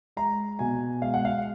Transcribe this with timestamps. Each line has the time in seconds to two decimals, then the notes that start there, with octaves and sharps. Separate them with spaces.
0.17 G#3 A#5
0.59 B2 G#5
1.02 G#3 F5
1.14 F#5
1.25 F5